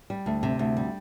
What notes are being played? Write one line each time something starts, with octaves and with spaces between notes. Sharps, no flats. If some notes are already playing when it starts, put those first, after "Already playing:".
G3
D2
C3
D2
G3